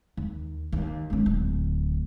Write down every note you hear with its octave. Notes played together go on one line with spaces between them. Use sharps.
D#2
D#2
G#3 C#4
D1 D2